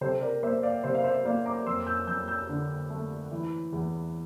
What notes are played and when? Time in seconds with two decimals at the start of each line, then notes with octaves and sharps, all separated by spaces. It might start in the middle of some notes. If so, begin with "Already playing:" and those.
0.01 C3 A4 C5
0.22 A#4 D5
0.43 A#3 C5 E5
0.63 D5 F5
0.84 C3 C5 E5
0.95 F5
1.04 C5 E5
1.25 A#3 D5 F5
1.46 A#5 D6
1.66 F2 C6 E6
1.87 E6 G6
2.07 F2 E6 G6
2.28 E6 G6
2.49 D3
2.90 A3
3.31 E3
3.73 E2